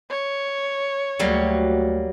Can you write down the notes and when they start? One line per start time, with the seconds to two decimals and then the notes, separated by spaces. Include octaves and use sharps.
0.10 C#5
1.19 D2 F#3 G3 A#3